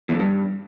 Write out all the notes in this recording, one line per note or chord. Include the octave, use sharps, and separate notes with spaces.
E2
F2
G2